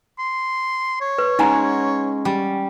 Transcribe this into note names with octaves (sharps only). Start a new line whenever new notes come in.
C6
C#5
B4
G#3 C#4 D#4 F#4 G#5 A#5
G3